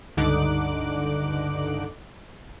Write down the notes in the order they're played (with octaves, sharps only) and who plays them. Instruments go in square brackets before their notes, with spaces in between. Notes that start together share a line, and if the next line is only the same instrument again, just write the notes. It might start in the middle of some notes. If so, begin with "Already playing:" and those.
[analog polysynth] C#2 G2 D3 D#4 D6 F#6